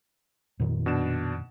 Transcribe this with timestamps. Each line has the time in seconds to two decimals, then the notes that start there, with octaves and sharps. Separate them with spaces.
0.60 F2 A#2 D#3
0.86 B2 D4 E7